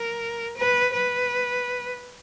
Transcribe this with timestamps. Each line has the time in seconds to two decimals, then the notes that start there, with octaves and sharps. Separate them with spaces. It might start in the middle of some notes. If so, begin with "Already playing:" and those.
Already playing: A#4
0.57 B4
0.93 B4